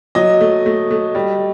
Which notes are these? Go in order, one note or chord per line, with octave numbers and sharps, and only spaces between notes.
F#3 D#5
A3
A3
A3
G3